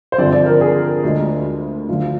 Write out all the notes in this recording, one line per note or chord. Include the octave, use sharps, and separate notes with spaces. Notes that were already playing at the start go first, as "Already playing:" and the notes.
C5
G2 D3 F3 C4 D5
D5
A#4
G#4
D2 D3 G#3
D2 D3 F3 F4